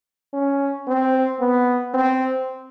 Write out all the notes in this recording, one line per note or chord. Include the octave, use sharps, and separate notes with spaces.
C#4
C4
B3
C4